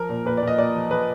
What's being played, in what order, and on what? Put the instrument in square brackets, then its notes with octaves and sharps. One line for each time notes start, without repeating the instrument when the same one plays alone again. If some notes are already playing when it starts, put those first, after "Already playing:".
Already playing: [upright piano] F3 A#4
A#2
A#2 B4
D5
A#2 D#5
A#2 D5
F3
F3 B4